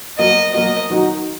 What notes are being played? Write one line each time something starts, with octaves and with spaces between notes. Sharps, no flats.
F#3 A#3 F#4 D#5
F#3 A#3 F#4 D#5
D#3 F#3 D#4 F#4